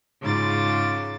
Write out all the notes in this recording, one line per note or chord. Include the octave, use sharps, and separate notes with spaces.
G#2 C#3 F4 D6 A6